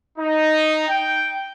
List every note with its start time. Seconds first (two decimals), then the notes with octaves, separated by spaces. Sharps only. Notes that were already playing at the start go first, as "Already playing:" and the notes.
0.18 D#4
0.88 G5